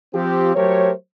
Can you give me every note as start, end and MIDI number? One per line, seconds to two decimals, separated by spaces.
0.14 0.54 53
0.14 0.54 60
0.14 0.54 65
0.14 0.54 67
0.55 0.91 54
0.55 0.91 57
0.55 0.91 67
0.55 0.91 70
0.55 0.91 72
0.55 0.91 73